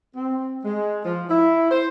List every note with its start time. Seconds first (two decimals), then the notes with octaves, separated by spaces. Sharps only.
0.16 C4
0.64 G#3
1.05 F3
1.29 E4
1.71 C5